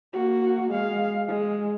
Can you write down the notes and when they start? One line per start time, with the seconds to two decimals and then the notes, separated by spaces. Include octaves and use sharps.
0.13 A#3 F#4
0.72 G#3 F5
1.28 G#3